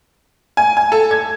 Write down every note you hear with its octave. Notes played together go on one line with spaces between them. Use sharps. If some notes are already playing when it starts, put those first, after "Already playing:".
G#5
G#5
A4
G#6